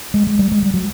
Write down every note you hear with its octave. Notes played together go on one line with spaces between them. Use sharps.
G#3
G#3
G3
G#3
G3
F#3